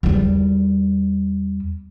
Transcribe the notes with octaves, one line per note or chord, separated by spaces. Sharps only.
E2 G3